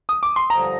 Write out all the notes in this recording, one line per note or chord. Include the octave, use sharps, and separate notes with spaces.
D#6
D6
C6
G2 D3 F3 A#5